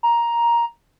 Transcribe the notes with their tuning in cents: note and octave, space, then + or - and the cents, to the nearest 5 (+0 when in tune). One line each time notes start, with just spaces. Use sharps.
A#5 +10